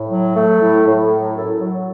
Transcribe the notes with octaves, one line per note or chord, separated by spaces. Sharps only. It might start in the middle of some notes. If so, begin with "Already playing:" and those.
Already playing: A2
F#3
A3
A2
A2
F#3
F#2 E4 A4
F#3